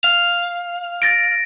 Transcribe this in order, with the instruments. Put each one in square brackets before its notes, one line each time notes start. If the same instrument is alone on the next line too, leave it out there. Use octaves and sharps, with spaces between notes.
[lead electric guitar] F5
[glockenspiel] A6 A#6 D7